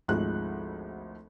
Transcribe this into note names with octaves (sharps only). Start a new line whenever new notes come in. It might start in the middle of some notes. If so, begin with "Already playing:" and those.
G#1 D2 F3 G#3 F#6